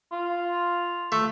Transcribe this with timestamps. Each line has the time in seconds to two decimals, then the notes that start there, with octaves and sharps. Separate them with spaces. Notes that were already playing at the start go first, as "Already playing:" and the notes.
0.12 F4
1.12 A3